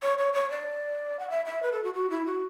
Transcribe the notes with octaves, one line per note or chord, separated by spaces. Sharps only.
C#5
C#5
C#5
D5
F#5
E5
E5
B4
A4
F#4
F#4
E4
F#4